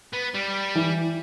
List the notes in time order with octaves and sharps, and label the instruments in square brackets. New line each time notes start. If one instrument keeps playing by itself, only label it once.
[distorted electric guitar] B3
G3
[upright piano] E3